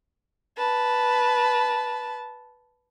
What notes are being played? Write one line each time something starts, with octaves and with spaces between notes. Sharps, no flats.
B4 A5